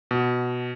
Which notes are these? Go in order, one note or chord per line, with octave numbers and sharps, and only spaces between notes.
B2